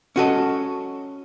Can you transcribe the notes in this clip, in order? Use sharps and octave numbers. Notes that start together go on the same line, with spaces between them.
C#4 F#4 A4 D#5